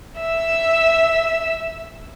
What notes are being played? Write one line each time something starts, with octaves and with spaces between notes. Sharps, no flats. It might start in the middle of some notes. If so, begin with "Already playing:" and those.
E5 E6